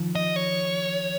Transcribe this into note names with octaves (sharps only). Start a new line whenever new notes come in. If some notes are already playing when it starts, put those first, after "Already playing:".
Already playing: D#3 F3
D#5
C#5